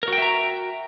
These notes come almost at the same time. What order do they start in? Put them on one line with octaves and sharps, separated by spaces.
A#4 F#4 G5 E5 A#5